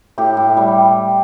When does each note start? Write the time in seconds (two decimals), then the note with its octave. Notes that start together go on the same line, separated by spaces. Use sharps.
0.18 A2 G4
0.37 A2
0.57 G3